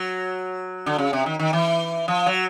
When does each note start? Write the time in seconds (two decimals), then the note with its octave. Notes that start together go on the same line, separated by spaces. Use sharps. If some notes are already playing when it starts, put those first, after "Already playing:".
Already playing: F#3
0.86 D3
0.98 C#3
1.13 C3
1.26 D#3
1.39 D#3
1.53 E3
2.08 F3
2.26 F#3